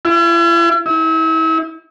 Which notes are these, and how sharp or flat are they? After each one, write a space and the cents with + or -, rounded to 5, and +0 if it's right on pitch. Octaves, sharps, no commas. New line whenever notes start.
E4 +45
E4 -35